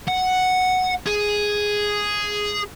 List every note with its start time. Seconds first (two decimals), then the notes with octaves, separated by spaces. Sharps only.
0.08 F#5
1.07 G#4